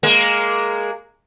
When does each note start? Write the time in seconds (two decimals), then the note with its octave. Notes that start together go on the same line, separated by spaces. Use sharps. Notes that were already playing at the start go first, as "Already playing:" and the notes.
0.03 G#3 A#3